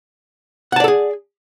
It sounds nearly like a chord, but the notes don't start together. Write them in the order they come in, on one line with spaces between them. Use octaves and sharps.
F#5 A5 D5 A4 G#4